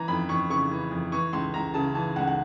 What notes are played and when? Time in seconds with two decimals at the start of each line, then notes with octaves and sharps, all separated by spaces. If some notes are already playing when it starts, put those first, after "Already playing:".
Already playing: E3 A#5
0.08 F2 B5
0.29 F2 C#6
0.50 C#3 C#6
0.71 E3
0.91 F2
1.12 E3 C#6
1.33 C#2 C6
1.54 C#2 A#5
1.74 C#3 A5
1.95 E3 A5
2.16 C#2 F#5
2.27 F#5